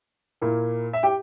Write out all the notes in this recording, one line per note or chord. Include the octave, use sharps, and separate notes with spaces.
A#2 A#3 E4
E5
G4 G5